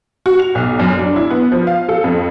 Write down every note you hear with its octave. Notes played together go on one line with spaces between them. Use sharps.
F#4
F7
B1
F#2
D4
E4
B3
F3
F5
A4
F2